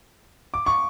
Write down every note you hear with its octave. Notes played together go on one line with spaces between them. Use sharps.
D6
C#6